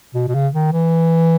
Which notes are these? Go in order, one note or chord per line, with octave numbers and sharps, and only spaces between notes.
B2
B2
C#3
D#3
E3